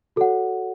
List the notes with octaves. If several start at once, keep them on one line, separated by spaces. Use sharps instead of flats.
F#4 A4 C#5 F#5